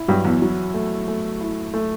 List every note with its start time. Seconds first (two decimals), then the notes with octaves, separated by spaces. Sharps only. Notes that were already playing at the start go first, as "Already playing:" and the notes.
Already playing: E4
0.08 G2 F#3
0.25 E2
0.42 F#3
0.74 A3
1.08 A3
1.41 E4
1.74 A3